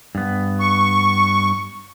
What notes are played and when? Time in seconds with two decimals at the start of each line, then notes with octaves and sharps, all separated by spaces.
0.15 G2 B3
0.60 C#6